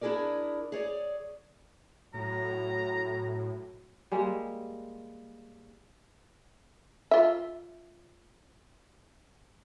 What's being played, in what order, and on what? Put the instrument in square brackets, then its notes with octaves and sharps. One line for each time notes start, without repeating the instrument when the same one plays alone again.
[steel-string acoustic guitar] D4 E4 F4 G#4 A#4 D5
G#4 C#5 D5
[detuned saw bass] A2 [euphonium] F#3 [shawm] A#5
[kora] G3 G#3 A#3
[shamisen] F4 E5